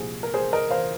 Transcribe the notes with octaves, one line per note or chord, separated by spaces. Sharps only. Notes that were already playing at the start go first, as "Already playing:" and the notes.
Already playing: C2 A#2 F3 G#4 C5
A#4
G#4 C5
A#4 D#5
C5 F5